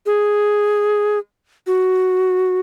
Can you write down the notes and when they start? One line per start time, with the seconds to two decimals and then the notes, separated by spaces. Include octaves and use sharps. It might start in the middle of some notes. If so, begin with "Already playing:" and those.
0.06 G#4
1.67 F#4